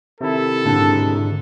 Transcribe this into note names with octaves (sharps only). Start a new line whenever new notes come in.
C3 D#3 E4 A4
G#2 D3